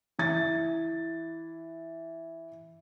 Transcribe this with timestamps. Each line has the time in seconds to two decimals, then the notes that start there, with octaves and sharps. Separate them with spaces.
0.19 E3 A6